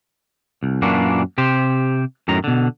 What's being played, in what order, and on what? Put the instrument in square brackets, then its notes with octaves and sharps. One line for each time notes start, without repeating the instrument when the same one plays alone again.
[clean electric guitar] C2
F#2 A#2 E3 A#3 D4 F#4
C3 G4 C5
F#2 A2 D#3 A#5
B2 D3